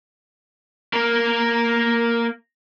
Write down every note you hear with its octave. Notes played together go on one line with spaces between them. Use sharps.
A#3 A#4